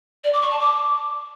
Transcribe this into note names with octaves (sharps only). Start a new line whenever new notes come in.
D5
D6
C#6
A5
D6